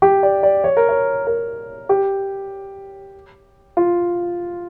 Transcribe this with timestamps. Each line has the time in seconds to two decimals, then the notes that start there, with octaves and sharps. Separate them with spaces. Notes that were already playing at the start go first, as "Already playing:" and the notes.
0.02 G4
0.23 D5
0.43 D5
0.64 C#5
0.77 A#4
0.89 C#5
1.27 A#4
1.89 G4
3.77 F4